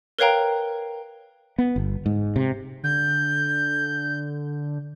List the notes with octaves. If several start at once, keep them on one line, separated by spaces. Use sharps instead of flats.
A#4 B4 C#5 F5 G5 A#5
B3
G1
G#2
C3
D3 G6